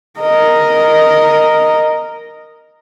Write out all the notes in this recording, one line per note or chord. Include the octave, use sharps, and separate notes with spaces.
A#4 D#5